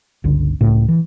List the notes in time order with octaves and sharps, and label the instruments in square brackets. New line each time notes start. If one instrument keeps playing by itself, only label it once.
[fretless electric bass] G1 C#2 D3
C#2 A2
E3